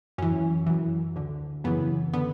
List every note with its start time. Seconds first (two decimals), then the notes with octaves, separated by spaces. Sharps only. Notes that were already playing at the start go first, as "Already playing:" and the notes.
0.18 F#2 E3 C#4
0.67 F#2 E3
1.15 D2 D3
1.64 F#2 C#3 E3 B3
2.13 D3 B3